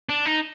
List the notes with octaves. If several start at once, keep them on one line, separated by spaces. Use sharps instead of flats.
D4
D#4